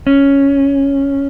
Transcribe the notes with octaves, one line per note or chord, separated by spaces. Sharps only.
C#4